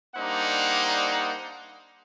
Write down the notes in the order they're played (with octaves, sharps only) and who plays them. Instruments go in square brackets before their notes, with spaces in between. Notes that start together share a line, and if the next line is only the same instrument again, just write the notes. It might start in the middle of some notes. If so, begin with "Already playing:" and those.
[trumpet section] G3 A#3 D4 D#4 C5 F#5